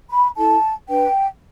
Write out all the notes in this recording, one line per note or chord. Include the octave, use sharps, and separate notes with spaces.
B5
E4 A4 A5
D4 B4 G5